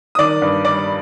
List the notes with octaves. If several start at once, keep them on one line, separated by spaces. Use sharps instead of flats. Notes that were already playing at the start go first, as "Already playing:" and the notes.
D#6
D#3 D5 D6
G2
G3 D5 D6